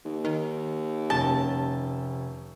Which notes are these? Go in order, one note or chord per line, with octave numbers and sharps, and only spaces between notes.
D#2
D#3
F1 C#4 A5 G7